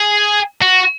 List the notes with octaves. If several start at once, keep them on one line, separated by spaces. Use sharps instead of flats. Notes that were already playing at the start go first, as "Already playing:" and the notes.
Already playing: G#4
F#4